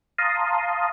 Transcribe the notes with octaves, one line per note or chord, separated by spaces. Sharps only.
F5 A5 A#5 C6 D#6